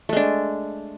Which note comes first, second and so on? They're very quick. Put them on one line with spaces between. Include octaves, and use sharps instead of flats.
A3 G#3 D4